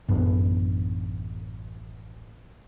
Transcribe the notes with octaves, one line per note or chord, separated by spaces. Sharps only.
A1 F#2 B3 D4